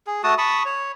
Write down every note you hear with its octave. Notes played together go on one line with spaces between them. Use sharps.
G#4
A3 F#4 A5 D#6
A5 B5 C#6 D#6
C#5